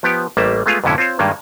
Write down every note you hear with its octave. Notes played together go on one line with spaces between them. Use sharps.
F3 B3 G4
A1 G3 A3 A#3 E5
G#3 A3 B3 F4 G#4 F5
F2 G#2 B2 D3 C#4 E4
C4 F4 C5 C#5
G2 D#3 G3 G#3 A#3